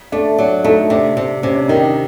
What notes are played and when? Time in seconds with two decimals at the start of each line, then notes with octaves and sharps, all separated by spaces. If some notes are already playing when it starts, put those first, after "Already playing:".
0.12 A3 D4
0.38 F#3 D4
0.64 A3 D#4
0.90 C3 D4
1.16 C3 D4
1.43 C3 C#4
1.55 D4
1.68 D#3 D#4
1.82 D4